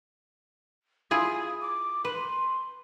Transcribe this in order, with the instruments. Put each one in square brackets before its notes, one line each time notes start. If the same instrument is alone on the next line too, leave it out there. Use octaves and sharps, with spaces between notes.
[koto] E4 F4 G#4 [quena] D#6
[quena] D6
[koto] B4 [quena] C6